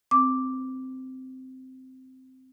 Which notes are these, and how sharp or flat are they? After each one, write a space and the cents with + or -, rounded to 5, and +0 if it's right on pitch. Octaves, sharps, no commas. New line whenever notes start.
C4 -10 D6 +0